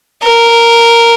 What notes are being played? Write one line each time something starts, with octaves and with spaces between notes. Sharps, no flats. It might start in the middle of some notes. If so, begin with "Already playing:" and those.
A#4